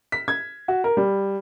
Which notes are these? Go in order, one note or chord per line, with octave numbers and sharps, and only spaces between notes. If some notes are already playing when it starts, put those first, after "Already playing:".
B6
G#6
F#4
A#4
G3